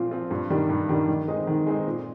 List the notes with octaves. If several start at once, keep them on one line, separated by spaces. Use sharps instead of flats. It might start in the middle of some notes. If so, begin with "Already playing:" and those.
Already playing: A#2 F3 C4 F4
F3 C4 F4
G2
D#3 G3 D4
G2
D#3 G3 D4
D#3
G#3 C4 D#4
D#3
G#3 C4 D#4
A#2